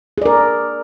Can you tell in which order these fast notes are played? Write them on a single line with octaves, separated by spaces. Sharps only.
G#4 D5 A#4